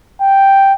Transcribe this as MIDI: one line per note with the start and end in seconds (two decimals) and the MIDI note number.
0.21 0.74 79